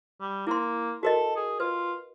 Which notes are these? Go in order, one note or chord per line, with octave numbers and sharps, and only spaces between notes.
G3
A#3 E4 C6
F#4 A4 A#4 D#5
G#4
F4 B4